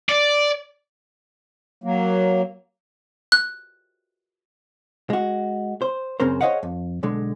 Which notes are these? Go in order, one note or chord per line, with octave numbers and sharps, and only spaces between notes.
D5
F#3 A#3
F#6
G#3 F#4
C5
F#2 C#3 C4 A#4 C5
G#4 C5 C#5 D#5 F5 F#5
F2
B1 D3 G#3